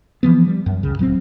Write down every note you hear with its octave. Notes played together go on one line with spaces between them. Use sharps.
E3 F3 B3
G3
F#2
C#2 C#3
D#1 F#3 A#3 C4